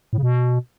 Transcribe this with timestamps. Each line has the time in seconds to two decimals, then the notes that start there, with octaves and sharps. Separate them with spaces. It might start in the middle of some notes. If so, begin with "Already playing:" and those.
0.13 A2
0.18 C#3
0.23 B2